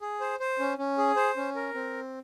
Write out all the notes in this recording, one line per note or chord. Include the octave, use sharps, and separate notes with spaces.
G#4
C5
C5
C#4
C#4
G#4
C5
C#4
A#4
C4